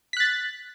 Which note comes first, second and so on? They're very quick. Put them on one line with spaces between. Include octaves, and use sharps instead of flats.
B6 F#6 A6